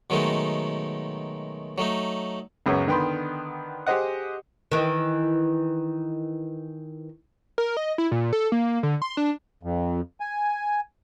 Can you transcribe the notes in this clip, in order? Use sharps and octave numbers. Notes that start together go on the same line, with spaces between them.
B2 D#3 F#3 G#3 A3 D#4
F#3 A3 D#4
C#2 F#2 C#3 B3 C#4
D3 D#3 B3 G5 B5 C6
G4 G#4 C5 D#5 F#5
D#3 E3
A#4
D#5
E4
A#2
A4
A#3
D3
C6
D4
F2
G#5